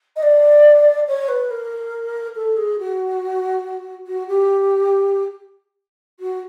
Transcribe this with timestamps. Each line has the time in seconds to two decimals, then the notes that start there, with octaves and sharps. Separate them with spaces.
0.16 D#5
0.23 D5
1.07 C#5
1.28 B4
1.50 A#4
2.36 A4
2.57 G#4
2.79 F#4
4.07 F#4
4.28 G4
6.20 F#4